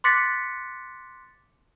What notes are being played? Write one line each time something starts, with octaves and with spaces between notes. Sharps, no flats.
C6 D6 F#6 A6 B6 C#7